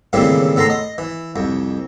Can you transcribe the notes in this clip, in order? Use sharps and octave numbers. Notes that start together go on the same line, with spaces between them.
D#2 A2 C#3 E3 G3 C4
A2 B3 A4 A#5 C6
D#5
E3
C2 F2